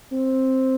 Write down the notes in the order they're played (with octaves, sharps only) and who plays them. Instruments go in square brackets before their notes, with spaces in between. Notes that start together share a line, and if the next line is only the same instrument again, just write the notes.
[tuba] C4